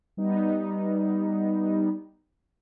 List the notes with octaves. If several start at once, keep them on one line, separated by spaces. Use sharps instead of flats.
G3 B3 D#4